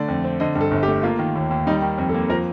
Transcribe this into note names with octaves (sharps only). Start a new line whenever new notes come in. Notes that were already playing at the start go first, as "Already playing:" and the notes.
Already playing: D3 A3 D5
F2
C4
D3 D#5
G2
A4
G1
G4
A3
A#3 F4
D#3
D#2
D#2
G3 D#4
D#3
F2
A4
A#3
F3 A#4